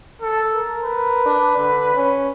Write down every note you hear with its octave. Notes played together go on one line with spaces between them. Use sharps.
A4
A#4
B4
D4
D3
C#4